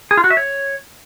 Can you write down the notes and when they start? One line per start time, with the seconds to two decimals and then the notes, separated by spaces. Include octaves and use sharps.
0.11 G#4
0.17 F4
0.24 F#4
0.30 E5
0.37 C#5